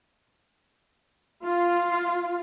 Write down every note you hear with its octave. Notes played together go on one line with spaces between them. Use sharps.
F4